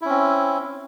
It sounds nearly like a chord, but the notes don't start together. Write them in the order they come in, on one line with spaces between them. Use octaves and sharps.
E4 C#4 C4